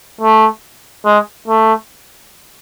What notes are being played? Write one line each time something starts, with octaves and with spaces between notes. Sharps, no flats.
A3
G#3
A3